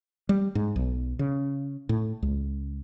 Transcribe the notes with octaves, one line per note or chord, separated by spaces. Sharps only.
G3
G#2
B1
C#3
A2
C#2